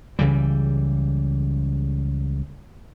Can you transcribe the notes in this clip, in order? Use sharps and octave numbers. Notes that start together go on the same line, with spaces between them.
C#2 C#3 E3 G3